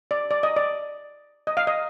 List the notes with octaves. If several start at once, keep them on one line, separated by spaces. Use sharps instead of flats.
D5
D5
D#5
D5
D#5
F5
D#5